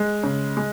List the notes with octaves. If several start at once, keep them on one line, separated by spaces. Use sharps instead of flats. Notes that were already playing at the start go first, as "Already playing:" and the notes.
Already playing: G#3
C#3
G#3